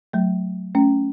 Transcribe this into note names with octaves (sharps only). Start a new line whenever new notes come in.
F#3 A3
A3 C#4